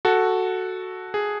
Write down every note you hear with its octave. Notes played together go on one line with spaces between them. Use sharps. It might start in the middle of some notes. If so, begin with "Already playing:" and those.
F#4 A4
G#4